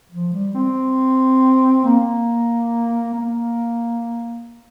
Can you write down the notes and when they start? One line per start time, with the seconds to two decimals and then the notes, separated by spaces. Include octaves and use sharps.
0.12 F3
0.33 G3
0.55 C4
1.85 A#3
3.15 A#3